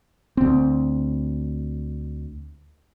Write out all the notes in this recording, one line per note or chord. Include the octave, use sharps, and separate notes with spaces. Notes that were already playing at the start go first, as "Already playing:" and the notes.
D2 C4